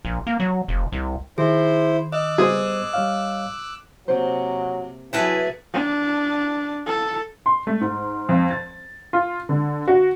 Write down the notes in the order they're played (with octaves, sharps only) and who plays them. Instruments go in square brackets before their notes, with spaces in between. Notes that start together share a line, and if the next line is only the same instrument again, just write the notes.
[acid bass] A#1
A#3
F#3
F1
C2
[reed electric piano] D#3 [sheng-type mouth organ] E4 C5 [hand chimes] G#4
[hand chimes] D#5 [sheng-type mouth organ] D6 E6 F#6
[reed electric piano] G3 B3 C5 [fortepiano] G#4
[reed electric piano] G3 C#5 F5
[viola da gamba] C3 A#3 [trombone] F#3 [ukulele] C5
[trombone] E3 [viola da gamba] F#3 G#4 [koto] E4 A4 B4
[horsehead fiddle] D4
A4
[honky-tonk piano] C6
A3
G#2
F2
A6
F4
D3
F#4